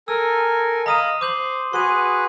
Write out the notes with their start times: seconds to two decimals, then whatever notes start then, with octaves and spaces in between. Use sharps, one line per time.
0.08 A4 A#4 G#5 E6
0.86 D#5 F5 A#5 B5 D#6 D#7
1.21 C5 D6 G6 F#7
1.73 F#4 G#4 B4 C6 D#7